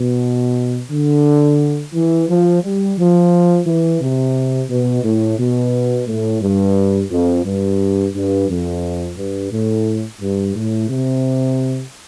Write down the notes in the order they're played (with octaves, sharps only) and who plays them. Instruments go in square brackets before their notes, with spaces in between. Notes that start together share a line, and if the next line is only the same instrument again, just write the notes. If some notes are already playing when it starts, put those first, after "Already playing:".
Already playing: [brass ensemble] B2
D3
E3
F3
G3
F3
E3
C3
B2
A2
B2
A2
G2
F2
G2
G2
F2
G2
A2
G2
A2
C3